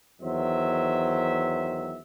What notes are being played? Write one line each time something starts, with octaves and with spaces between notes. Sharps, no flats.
E2 D#3 F#3 C5 E5